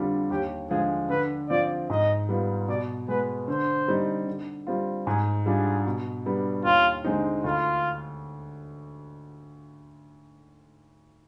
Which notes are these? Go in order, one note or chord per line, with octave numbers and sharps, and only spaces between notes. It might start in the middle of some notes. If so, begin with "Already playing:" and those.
Already playing: F2 D3 G3 D4 F4
D#2 G4
D3 F3 G#3 G#4
D3 B4
F3 C4 F4 D5
G#2 D#5
G3 B3 F4
B2 D5
G#3 B3 B4
D3 C5
G3 C4 D#4
D3
G3 C4 F4
G#2 G#4
G3 D4 F4 G#4
B2
G3 B3 D4
D#2 F4
D3 G#3 C4 D#4
D2 F4